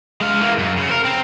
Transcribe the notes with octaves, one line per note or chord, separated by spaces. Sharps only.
G#3 F5
E3 A#3
F#2
C#3
A#4 C5
C4